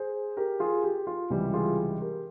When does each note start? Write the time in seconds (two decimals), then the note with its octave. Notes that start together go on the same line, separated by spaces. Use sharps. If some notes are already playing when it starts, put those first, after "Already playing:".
Already playing: G#4 C5
0.37 G4 A#4
0.60 F4 G#4
0.84 G4
1.07 F4
1.30 C#2 C3 E3 G3
1.54 F4 G#4
2.01 G4 A#4